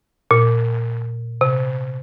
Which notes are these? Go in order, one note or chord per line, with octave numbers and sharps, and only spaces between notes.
A#2
C3